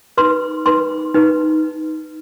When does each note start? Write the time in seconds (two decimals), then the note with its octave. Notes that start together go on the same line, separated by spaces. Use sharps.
0.17 D#4 B4 C6
0.66 D#4 B4 C6
1.14 D#4 B4